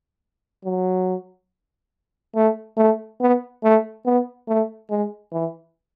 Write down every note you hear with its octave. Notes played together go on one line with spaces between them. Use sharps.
F#3
A3
A3
B3
A3
B3
A3
G#3
E3